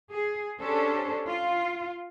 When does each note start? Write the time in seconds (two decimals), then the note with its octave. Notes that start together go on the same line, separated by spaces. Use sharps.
0.12 G#4
0.60 C#4 D4 G4 A4 C5
1.27 F4